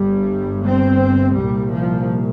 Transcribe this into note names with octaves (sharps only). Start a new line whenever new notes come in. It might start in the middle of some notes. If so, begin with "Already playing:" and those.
Already playing: G1 G2 G3
C4
C2 A#2 G3
F3